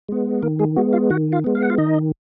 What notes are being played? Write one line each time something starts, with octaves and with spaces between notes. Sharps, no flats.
G#3 B3
D#3 A#3 A#4
G#3 G#4
G#3 B3 F#4
F4 F5
D#3 F#4 F#5
F4 F5
G#3 B3
F5
F#5
F4 F5
D#3 D#4 D#5